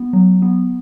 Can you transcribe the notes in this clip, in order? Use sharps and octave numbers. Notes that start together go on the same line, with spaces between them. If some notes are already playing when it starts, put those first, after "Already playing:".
Already playing: B3
F#3
B3